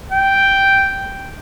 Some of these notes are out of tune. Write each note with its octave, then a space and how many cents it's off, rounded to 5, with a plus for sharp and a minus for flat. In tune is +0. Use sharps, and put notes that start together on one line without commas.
G5 -5